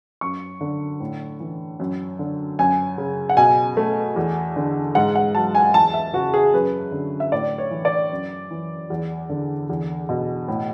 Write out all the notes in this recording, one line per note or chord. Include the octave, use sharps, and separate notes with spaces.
F#2 C#6
D3
A2
E3
F#2
D3
F#2 G#5
C#3
F#5
B2 G#5
A3
E2
D3
G#2 F#5
F#5
F#3 A5
G#5
E2 A5
E5
C#3 F#4
G#4
F#2 B4
D3
E5
A2 D5
C#5
E3
D5
F#2
E3
E2
D3
E2
B2
A2